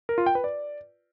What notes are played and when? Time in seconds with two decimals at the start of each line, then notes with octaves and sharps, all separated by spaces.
0.09 A#4
0.18 F4
0.26 G5
0.35 B4
0.44 D5